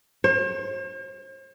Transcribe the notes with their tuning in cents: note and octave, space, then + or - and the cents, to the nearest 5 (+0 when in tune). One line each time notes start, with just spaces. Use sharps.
C5 +45